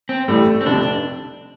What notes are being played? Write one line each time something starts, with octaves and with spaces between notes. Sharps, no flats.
C4
A1 A2 G3 A3
C4
F1 F2 C3 D4